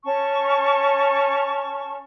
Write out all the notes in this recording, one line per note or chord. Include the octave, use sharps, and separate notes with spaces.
C#4 A5 C#6